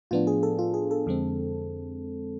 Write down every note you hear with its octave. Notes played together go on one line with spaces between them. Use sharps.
A2 F3 B3 D4 F4
G#4
A4
F4
G#4
A4
F2 D3 G#3 C4